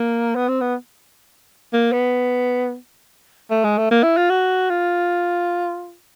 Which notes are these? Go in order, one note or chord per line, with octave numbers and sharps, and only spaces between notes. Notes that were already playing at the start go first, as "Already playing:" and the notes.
Already playing: A#3
B3
C4
B3
A#3
B3
A3
G#3
A3
A#3
E4
F4
F#4
F4